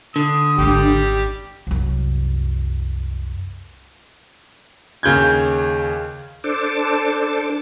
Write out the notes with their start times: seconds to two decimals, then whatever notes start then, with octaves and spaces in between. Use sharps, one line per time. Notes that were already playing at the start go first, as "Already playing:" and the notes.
0.16 D3 D#6
0.58 G#1 G3 G#3 G4
1.67 C2 F#2
5.03 D#2 C#3 G6 G#6
6.44 D4 A4 C5 D6